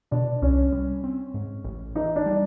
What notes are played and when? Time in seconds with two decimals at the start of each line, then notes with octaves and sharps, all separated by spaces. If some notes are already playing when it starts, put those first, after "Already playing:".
0.11 B2 D4
0.42 C2 C#4
0.73 G3
1.04 C4
1.34 G#2
1.65 A1
1.95 E3 D#4
2.16 D4
2.26 G3